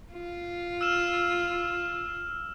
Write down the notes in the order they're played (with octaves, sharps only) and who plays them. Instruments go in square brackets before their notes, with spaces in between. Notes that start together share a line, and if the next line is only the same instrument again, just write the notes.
[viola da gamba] F4
[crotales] E6 F6 E7